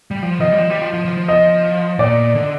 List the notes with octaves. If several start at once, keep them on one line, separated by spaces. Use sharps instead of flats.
G3
F3
F3 D#5
G3
F3
G3
F3
F3
F3
F3
D#5
A#2 D5
D3